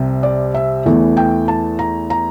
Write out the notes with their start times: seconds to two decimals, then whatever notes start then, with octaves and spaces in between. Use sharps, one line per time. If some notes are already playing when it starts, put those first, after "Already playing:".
Already playing: C2 C3
0.23 D5
0.54 E5
0.86 E2 E3 A3
1.17 G5
1.48 A5
1.79 A#5
2.10 A#5